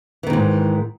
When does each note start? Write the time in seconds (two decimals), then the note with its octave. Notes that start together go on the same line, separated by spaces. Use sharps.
0.23 E3
0.27 D#3
0.30 E2
0.33 G#2